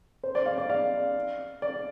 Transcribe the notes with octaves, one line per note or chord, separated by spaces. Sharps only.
C5
D5
F5
D5
F5
D5